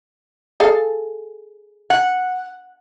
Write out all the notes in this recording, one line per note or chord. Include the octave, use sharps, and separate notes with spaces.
G#4 A4 F5
F#5